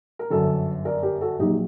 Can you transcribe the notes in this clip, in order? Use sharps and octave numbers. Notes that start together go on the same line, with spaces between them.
A#4
G1 F#2 D3 F#4 A4
A#4 D5
G4 A#4
F#4 A4
A#1 A#2 F#3 D#4 G4